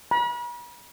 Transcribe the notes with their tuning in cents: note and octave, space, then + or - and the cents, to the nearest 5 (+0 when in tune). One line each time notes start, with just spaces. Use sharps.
B5 -45